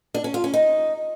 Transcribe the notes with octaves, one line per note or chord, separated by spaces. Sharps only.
D4
C#4
F4
C#4
D#4